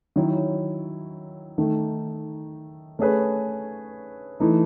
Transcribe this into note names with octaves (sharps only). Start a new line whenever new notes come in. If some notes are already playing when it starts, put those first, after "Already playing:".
D#3 F#3 C#4 E4
D#3 A3 D#4
A3 C#4 G#4 B4
E3 A3 D#4